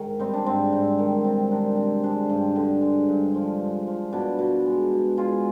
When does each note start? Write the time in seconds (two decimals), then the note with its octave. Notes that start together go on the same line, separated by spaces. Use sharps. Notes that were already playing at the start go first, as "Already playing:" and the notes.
Already playing: G#2 D#3
0.19 G3 C4 D#4
0.33 D4
0.46 G#2 C4
0.72 G#2
0.99 D#3
1.25 C3
1.51 D#3 D4
1.77 C3
2.03 G#3 D4
2.29 G2
2.56 D3
2.81 G#3
3.09 G2
3.34 F3
3.61 G#3
3.87 F3
4.12 B2 D4
4.39 B2
4.66 G#3
4.92 B2
5.17 G#3 F4 G#4